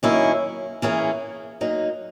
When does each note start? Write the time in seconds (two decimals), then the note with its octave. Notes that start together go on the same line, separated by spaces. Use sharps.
0.03 F#2 D#3 A#3 C#4 E4
0.82 E3 A#3 C#4 G#4
1.61 F#3 A#3 D#4